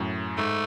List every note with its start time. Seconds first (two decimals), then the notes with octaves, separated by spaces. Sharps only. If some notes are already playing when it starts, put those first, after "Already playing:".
Already playing: F#2 A2
0.38 G#2 A3